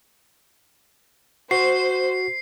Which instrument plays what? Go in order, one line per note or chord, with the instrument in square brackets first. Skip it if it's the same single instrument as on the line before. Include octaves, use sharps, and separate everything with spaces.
[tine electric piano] F#4 [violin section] C5 [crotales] C7